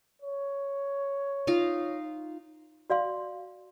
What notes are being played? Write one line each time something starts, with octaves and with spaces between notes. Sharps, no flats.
C#5
D#4 F4 F5
F#4 D5 F5 C6